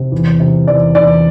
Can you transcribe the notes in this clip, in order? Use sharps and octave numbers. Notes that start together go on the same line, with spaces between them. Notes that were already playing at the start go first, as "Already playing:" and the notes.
Already playing: C3
E2
C3
E2 D5
E2 D5